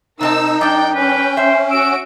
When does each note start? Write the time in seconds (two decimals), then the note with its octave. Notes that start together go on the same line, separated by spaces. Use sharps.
0.21 C3 C4 D#4 A#4 A5 E6
0.61 F#2 D4 D5 G5
0.95 C#4 B4 G5
1.37 C5 E5
1.71 F#4 E6 D7